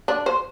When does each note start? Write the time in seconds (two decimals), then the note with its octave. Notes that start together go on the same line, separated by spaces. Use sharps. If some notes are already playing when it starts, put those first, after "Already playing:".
0.08 D4
0.26 C5